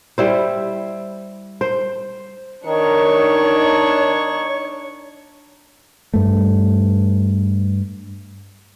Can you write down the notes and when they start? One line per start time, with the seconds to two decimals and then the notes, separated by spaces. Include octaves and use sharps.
0.18 G3 E4 C5
1.61 C5
2.66 D#3 D4 D#4 C#5 C#6
6.14 G2 A3